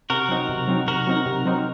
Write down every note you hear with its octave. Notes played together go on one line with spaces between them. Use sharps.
C3 F#4 A#4
F#3 C4 D#4
C3
F#3 C4 D#4
C3 F#4 A#4
F#3 C4 D#4
C3
F#3 C4 D#4